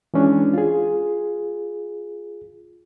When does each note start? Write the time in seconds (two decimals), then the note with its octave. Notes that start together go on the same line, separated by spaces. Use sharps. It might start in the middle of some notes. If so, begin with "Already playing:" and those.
0.14 E3 G#3 C#4 D4
0.54 F4 G#4